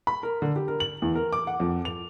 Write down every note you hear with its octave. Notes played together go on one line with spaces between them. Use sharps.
B5
A#4
D3
G4
A#4
F#7
E2
A#4
D6
F#5
F2
F7